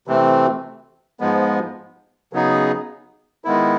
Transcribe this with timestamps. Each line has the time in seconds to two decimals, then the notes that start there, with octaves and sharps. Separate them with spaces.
0.07 C3 E3 A3 C4
1.20 G#2 F3 G#3 B3
2.33 C#3 F#3 B3 D#4 G#4
3.45 D#3 G#3 B3 E4